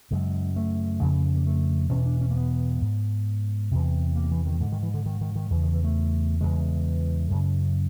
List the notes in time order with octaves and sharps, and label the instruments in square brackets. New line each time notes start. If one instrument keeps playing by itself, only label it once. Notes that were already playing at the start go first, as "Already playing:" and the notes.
[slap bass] F#2 C#3 G#3
A3
F2 C#3
A#3
A3
E2 B2 C#4
D4
C#4
A#3
B3
G#2
E2 C3
A#3
E3
D#3
G#2 D3
D#3
E3
D3
D#3
D#3
D#3
E2 D#3
C#3
D#3
E3
A3
E2 C#3 G#3
F#2 C#3